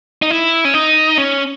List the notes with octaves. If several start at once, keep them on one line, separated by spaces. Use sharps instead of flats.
D#4
E4
C#4
D#4
C#4